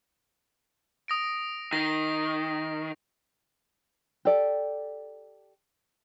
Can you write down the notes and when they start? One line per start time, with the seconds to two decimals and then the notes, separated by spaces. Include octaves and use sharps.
1.08 D#6 A#6 D7
1.73 D#3 A#6 C7
4.25 G4 A4 D5